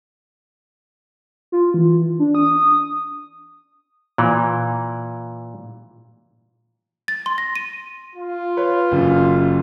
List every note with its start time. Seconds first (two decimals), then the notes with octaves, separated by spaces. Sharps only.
1.52 F4
1.74 E3
2.19 D4
2.35 D#6
4.18 A#2 E3
7.08 A6
7.26 C6
7.38 A#6
7.56 D#7
8.16 F4
8.57 B4 C#5
8.92 F#1 F#2